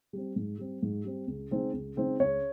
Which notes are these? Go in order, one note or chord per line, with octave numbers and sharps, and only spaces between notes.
G3 C4
G#2
G3 C4
G#2
G3 C4
C#2
C#3 G#3 C4 D#4
C#2
C#3 G#3 C4 D#4
C#2 C#5